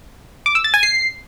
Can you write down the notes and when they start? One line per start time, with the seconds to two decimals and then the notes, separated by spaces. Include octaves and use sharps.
0.46 D6
0.55 E6
0.64 A6
0.74 G#5
0.83 C7